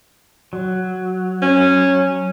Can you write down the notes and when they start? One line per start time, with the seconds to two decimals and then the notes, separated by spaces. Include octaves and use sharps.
0.53 F#3
1.42 C#4